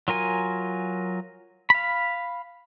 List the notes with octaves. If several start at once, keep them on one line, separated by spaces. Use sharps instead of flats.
F#3 F4 A#4 G#5
F5 B5